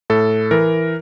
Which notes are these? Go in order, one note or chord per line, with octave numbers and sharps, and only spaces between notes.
A2 A4
E3 A#4